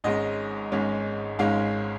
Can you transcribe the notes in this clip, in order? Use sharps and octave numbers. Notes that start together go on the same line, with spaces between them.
G#1 G#2 G#3 C#4 D#5
G#1 G#2 G#3 C#4
G#1 G#2 G#3 C#4 F5